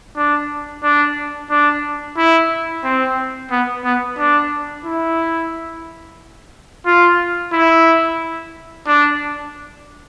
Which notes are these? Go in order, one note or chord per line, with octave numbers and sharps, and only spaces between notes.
D4
D4
D4
E4
C4
B3
B3
D4
E4
F4
E4
D4